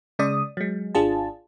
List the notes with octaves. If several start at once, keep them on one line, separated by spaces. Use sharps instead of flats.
C#3 G#3 D5 D#6
F#3 G#3
G#1 D4 F4 G#4 A5